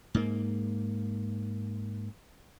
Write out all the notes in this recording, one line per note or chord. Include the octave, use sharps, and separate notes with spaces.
G#2 A#3